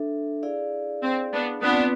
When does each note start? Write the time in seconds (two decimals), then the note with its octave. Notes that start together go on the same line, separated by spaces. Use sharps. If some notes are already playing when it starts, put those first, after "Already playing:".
Already playing: D4 A4 E5
0.43 E4 G#4 D5 F5
1.03 C4
1.32 B3 D4
1.63 B3 C4 D4 F4 B4